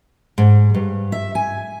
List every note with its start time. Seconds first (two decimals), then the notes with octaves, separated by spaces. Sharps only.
0.38 G#2
0.74 G2
1.12 E5
1.35 G#5